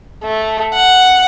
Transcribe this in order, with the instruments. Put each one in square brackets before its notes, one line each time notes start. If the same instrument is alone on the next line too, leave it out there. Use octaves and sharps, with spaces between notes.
[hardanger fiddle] A3
F#5